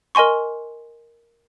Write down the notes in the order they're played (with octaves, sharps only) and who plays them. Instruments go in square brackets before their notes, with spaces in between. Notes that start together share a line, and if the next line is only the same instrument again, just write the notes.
[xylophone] A#4 D#5 G#5 C6 C#6